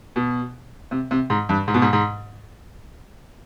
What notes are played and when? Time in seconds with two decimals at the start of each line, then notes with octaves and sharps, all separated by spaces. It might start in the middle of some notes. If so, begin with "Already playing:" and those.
0.16 B2
0.91 C3
1.11 C3
1.30 G#2
1.49 G2
1.68 G#2
1.74 B2
1.82 G#2
1.93 G#2